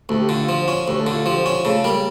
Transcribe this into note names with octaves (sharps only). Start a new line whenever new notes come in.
D2 A3 A4
G4
D3 F4
F4
F3
C#4 F4
D2 G4
A3 A4
D3
F4
F3 G4
C#4 F4
C#3 A3 A4
G3 A#3 A#4